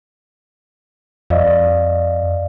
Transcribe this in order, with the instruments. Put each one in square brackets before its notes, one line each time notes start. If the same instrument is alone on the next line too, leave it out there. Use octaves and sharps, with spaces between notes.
[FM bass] F2 [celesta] D5 D#5 F5